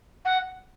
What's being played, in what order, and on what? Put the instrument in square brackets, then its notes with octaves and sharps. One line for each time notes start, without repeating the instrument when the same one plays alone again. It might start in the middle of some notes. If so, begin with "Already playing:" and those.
[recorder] F#5